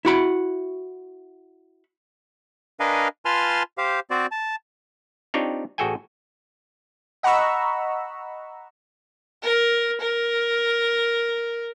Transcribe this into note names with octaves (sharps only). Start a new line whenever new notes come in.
E4 F#4 B5
D4 A#4 B4 D#5 F5 G#5
F4 B4 G#5 A5 C6 F6
G4 C5 F5
C4 F#4 C5 D5
A5
C4 D4 D#4 F4 G4 C#5
A1 F#4 G#4 A4 G5 G#5
D#5 F#5 A#5 B5 C#6 E6
A#4
A#4